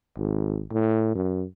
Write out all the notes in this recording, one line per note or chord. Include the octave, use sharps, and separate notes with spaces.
G#1
A2
F#2